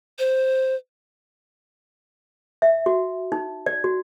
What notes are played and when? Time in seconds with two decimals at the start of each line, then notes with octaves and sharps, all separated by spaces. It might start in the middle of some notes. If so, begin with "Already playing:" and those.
0.19 C5
2.62 E5
2.86 F#4
3.32 D#4
3.66 D5
3.84 F#4